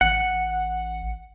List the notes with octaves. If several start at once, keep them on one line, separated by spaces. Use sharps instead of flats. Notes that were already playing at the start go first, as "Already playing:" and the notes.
A1 F#5